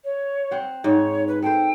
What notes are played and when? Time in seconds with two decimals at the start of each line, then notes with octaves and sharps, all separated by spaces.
0.04 C#5
0.51 C4 F#5
0.84 G#2 C#5
1.27 B4
1.42 A4 C5 G5